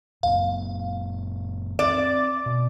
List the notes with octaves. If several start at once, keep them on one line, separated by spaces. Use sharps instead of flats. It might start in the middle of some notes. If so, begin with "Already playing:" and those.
F#1 C#2 F#2 F5
C4 D5
B2